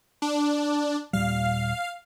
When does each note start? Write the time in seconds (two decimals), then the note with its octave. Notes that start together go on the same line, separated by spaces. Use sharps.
0.22 D4
1.13 D#1 A#2 G3 F5